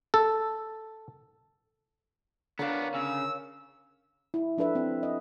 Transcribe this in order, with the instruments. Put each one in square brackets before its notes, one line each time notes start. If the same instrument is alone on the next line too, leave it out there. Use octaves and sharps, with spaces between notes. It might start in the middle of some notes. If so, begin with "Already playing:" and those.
[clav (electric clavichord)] A4
[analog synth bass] D3 [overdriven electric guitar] B3 D4 [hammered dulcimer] A#4 C#5 F5
[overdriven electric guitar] C#3 [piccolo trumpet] E6
[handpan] E4
F3 D4 A4 B4 E5
C4
D#5